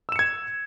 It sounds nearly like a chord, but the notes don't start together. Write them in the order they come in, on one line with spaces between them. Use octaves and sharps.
E6 E7 C#7 G#6